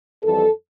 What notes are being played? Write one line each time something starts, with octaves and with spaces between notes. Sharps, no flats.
F2 E3 G3 A4